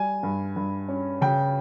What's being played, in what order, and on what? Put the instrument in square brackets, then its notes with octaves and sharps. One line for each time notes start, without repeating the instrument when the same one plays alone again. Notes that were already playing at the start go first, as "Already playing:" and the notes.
Already playing: [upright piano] G3 G#5
G2
G2
C#4
C#3 G5